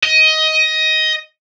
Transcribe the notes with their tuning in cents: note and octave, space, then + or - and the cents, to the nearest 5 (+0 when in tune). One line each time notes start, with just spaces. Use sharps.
D#5 +15